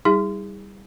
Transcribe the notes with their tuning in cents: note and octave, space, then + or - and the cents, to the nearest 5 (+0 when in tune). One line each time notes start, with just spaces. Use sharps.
G3 +0 E4 -45 G#4 -25